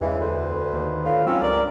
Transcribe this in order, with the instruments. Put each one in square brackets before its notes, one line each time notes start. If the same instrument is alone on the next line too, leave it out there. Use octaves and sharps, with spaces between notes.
[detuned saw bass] E2 [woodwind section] G2 E3 [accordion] C#3 G#3
[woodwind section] D2 [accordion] B4 C5
[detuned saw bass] D#2
[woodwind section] D2 A2 F4
[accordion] G#2 F4 E6 [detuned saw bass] F#3 [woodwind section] C4 C#4
[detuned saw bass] C#2 [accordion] G2 A#4 [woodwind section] D5